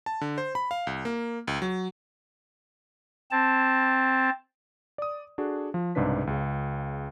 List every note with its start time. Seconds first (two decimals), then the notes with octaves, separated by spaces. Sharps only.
0.06 A5
0.21 D3
0.38 C5
0.55 B5
0.71 F5
0.87 C2
1.05 A#3
1.48 C#2
1.62 F#3
3.31 C4 A5
4.98 D5 D#6
5.38 D4 F#4 G#4 A4
5.74 F3
5.95 C2 G#2 C#3 D4 B4 B6
6.27 C#2 C#3